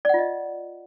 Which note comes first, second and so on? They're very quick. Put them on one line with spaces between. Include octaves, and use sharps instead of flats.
D5 F#5 F4 D#5